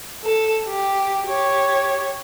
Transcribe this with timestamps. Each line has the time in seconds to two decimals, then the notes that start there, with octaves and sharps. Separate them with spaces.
0.24 A4
0.68 G4
1.27 G4 C#5